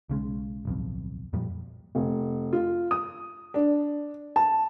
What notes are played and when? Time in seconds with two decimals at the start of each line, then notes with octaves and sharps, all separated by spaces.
0.09 B1 C#3 G#3
0.65 D1 B1 F2
1.33 F2 A#2 F3 G3
1.95 F1
2.53 F4
2.91 D#6
3.54 D4
4.36 A5